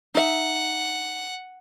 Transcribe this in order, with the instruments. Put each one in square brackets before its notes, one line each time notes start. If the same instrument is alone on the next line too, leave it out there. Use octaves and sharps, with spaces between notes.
[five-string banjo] D#4 E5 [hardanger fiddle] F#5